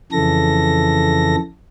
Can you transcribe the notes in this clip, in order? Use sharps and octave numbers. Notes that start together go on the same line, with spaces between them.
F2 C#3 E3 A4 A#6